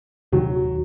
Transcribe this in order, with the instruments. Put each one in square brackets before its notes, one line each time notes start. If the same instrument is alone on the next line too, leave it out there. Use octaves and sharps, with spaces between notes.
[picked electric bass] D#1 C3 D#3 [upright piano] F#3